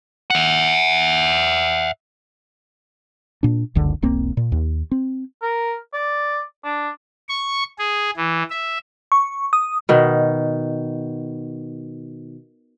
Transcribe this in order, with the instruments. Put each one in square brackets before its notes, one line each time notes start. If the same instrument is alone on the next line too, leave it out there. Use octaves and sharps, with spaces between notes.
[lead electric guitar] E5 F#5
[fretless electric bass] A#2 D4
F#1 C#2 D3
E1 B1 A#3 C4
A#2
D#2
C4
[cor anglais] A#4
D5
D4
[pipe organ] C#6
G#4
E3
E5
[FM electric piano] C#6
D#6
[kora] B2 D#3